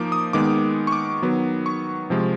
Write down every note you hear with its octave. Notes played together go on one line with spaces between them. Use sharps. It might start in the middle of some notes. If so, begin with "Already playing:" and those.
Already playing: F3 A#3 D#4 D6
D#6
D#3 G#3 B3 D6
C#6
D6
D#3 F#3 B3
C#6
C3 F3 G#3